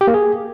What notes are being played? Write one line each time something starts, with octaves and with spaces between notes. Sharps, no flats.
G4
A#3
G#4